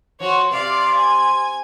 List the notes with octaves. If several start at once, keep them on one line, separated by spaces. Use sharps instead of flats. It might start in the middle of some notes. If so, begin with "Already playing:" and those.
F3 F#4 C#5
C3 D5 F5
G#5